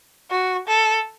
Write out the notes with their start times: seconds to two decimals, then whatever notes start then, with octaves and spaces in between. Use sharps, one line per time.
0.30 F#4
0.68 A4